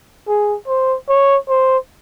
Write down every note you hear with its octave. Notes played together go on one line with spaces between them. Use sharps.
G#4
C5
C#5
C5